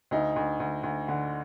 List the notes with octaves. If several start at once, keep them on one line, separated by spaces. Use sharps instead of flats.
D2 D#4
D2
D2
D2
D3